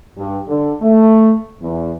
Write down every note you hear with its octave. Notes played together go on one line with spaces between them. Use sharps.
G2
D3
A3
E2